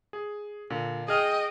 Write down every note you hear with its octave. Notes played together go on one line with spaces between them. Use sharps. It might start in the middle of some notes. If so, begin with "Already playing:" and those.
G#4
A#2 D3
G#4 D#5 G5 F6